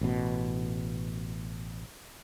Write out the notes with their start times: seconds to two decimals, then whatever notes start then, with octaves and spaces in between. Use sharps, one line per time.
0.01 A1 B2